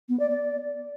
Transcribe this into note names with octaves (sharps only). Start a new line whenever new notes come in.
B3
D5
D5